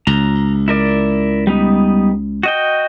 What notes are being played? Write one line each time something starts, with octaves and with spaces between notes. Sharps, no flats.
C#2 A#5
E4 A#4 D5
G3 B3 D#4
F#4 D#5 G5